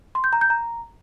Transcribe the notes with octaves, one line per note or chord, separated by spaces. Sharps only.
C6
G6
A#5
G6
A#5